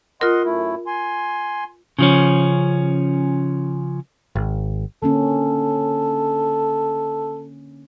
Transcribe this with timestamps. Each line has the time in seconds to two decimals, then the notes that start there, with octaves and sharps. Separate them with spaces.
0.21 F4 A#4 D#5 F#5 C6
0.45 F#2 A3 E4
0.87 G#5 C6
1.99 C#3 F3 C#4
4.36 G#1
5.02 D3 A#3 C#4 A4